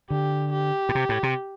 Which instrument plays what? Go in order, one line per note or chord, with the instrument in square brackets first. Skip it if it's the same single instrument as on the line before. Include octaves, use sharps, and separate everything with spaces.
[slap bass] D3 [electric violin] G4
[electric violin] G4
[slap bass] A2
C3
A2
C3